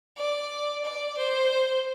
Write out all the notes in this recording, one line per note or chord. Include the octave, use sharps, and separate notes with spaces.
D5
D5
C5